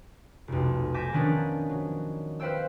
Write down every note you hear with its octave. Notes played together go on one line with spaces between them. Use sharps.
F1 B1
G#5 D6 G6 A#6 B6 E7
D#3 F3 B3 C#4 D4
F#3
B4 C5 F5 G5 E6